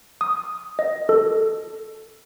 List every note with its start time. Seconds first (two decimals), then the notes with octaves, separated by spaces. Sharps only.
0.21 D#6
0.79 D#5
1.09 A4